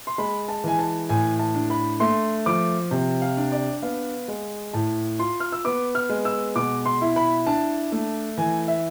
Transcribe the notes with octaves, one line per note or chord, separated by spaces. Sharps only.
C6
G#3 B5
A5
E3 G#5
A5
A2 G#5
A5
D4
B5
A3 C6
F3 D6
C3
F5
D4
D5
B3 F5
G#3
A2 A5
F4 C6
F6
E6
B3 D6
F6
G#3
E6
B2 D6
C6
E4
B5
D4 A5
A3
E3 G#5
E5